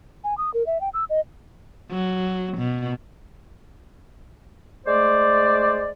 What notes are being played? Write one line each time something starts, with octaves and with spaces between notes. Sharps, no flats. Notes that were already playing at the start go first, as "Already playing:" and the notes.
G#5
D#6
A#4
E5
G5
E6
D#5
F#3
B2
G#3 A3 C5 D5